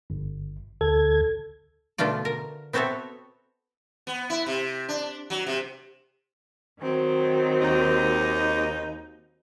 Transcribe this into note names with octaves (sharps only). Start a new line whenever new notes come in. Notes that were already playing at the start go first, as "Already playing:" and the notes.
G1
D2 A4 G#6
B2 D3 A3 F4 D5
A#4
B3 C4 F#4 A4 C#5 E5
B3
E4
C3
D4
F#3
C3
D#3 F#3 C4
D#2 D#4